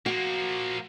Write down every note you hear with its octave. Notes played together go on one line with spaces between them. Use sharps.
F3 A#3 F#4